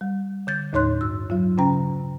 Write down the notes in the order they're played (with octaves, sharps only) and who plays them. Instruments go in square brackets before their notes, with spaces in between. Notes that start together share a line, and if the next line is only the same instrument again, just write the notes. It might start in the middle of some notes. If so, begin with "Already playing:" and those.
[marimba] G3
D3 G6 A6
D#2 A2 D#4 C#5 C6 F#6
G2 E6
F#3 F4
C#3 C#4 G5 A#5